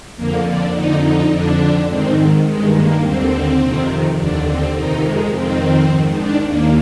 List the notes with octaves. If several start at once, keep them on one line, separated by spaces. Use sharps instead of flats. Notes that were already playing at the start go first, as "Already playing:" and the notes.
F2 D3 A#3
D4
F2 D3 D#4
D#4
F2 D3 D4
G#2 D#3 C4
G2 D#3 G#3
A#3
D#2 D3 C4
F2 C3 D#3
D#2 D3 D4
C4
F2 C3 D#3 D#4
G#3
F2 D#3 C4
G#2 D#3
D4
D#2 D#3 A#3